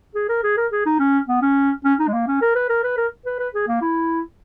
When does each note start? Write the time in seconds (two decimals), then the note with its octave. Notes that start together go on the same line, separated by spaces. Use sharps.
0.15 G#4
0.29 A#4
0.43 G#4
0.57 A#4
0.72 G#4
0.86 D#4
0.99 C#4
1.28 B3
1.42 C#4
1.84 C#4
1.99 D#4
2.08 G#3
2.13 A#3
2.27 C#4
2.41 A#4
2.55 B4
2.69 A#4
2.83 B4
2.97 A#4
3.26 B4
3.39 B4
3.54 G#4
3.68 A#3
3.81 E4